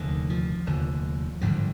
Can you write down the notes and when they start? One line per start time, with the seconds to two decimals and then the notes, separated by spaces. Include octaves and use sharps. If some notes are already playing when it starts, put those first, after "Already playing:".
Already playing: F1 D#2 D3 D#3
0.30 F3
0.66 F1 D#2 D3
1.41 G#1 G2 D3 F3